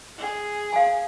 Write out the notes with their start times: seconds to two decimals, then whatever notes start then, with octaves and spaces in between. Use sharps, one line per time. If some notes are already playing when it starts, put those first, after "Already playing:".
0.18 G#4
0.73 F5 G#5